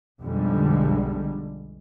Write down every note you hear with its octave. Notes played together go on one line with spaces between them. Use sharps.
B1 F2 D3 G3 G#3